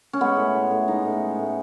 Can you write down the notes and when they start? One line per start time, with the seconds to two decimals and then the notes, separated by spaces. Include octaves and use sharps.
0.13 C#4
0.20 G#3 B3
0.37 A2
0.54 G#3
0.71 A2
0.88 G#3 D#4
1.05 A2
1.21 G#3
1.39 A2